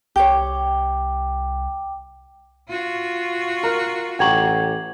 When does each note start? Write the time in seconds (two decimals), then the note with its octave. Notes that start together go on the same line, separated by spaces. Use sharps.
0.16 C2 G4 C#5 G5 D6
2.68 F4 F#4
3.63 A#4
4.19 A1 G4 F#5 A#5 C#6 G#6 F#7